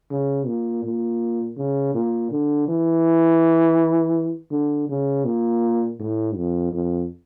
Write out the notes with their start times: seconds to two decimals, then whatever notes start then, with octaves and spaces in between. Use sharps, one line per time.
0.11 C#3
0.47 A#2
0.84 A#2
1.57 C#3
1.94 A#2
2.31 D3
2.68 E3
4.52 D3
4.89 C#3
5.25 A#2
6.00 A2
6.36 F2
6.73 F2